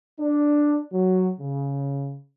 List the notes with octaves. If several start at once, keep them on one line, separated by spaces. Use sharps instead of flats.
D4
F#3
C#3